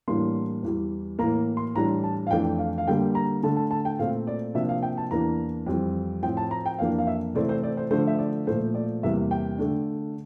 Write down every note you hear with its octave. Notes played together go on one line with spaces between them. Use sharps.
A2 E3 G3 A#3 D4 C6
E2 E3 G3
A2 E3 A#3 A#5
C6
A2 E3 G3 D4 A#5
A5
F5
F2 E3 A3 D4 G5
F5
F5
D3 G3 A#3 D4 G5
A#5
D3 A3 D4 A5
A5
A5
G5
A#2 A3 C4 F5
D5
C3 F3 A#3 D4 E5
F5
G5
A5
E2 E3 A#3 D4 A#5
F2 E3 G3 C4
A2 F3 C4 G5
A5
A#5
G5
F2 E3 A#3 D4 F5
F5
E5
C3 E3 A3 C4 D5
C5
D5
C5
D3 F3 A3 D4 C5
E5
D5
A#2 F3 A3 C5
D5
E2 C3 G3 A#3 E5
G5
D3 A3 D4